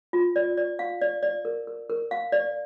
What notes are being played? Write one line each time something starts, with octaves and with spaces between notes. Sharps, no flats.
F4
D5
D5
F5
D5
D5
A#4
A#4
A#4
F5
D5